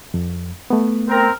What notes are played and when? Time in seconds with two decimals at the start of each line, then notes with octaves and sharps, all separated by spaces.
0.14 F2
0.70 A3 B3
1.08 C4 A#4